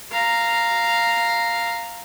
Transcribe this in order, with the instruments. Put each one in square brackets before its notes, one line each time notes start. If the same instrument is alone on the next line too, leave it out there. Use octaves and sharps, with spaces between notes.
[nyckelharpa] F5 A#5